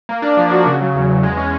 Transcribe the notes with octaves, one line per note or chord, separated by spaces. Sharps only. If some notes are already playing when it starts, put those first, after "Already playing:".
A#3
D4
F3
F#4
C#3
F#3
E2
E2
G#3
C#4